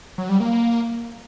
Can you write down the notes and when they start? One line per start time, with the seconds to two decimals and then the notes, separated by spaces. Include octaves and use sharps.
0.18 F#3
0.29 G3
0.40 A#3